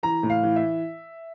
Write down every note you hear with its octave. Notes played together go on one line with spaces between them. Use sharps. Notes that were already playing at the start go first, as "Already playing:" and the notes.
E3 A#5
A2
F5
E3
E5